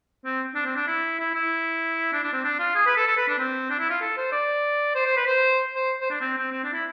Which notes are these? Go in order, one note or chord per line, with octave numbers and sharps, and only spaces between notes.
C4
D4
C4
D4
E4
E4
E4
D4
D4
C4
D4
F4
G#4
B4
A4
A4
B4
D4
C4
D4
E4
F4
A4
C5
D5
C5
C5
B4
C5
C5
C5
D4
C4
C4
C4
D4
E4